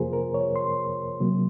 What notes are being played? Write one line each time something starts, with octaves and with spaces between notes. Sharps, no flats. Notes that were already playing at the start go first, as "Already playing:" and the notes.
Already playing: F2 C3 F3 A#3 F4 G#4 A#4 C5
A#4
C#5
C6
C3 F#3 A#3